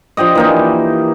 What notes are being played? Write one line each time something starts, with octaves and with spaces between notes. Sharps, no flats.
F3 D4 G4 D#5
E3 A#3 D#4